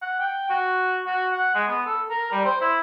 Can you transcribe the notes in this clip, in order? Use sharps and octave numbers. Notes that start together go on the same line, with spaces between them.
F#5
G5
F#4
F#4
F#5
G#3
B3
A4
A#4
G3
C5
E4